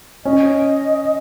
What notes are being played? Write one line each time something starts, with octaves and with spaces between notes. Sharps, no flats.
C#4 D#5